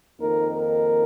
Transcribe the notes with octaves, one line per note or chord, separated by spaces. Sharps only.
F2 D#3 A#3 D#4 A#4
A#4